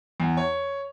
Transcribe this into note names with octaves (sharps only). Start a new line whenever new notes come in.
E2
C#5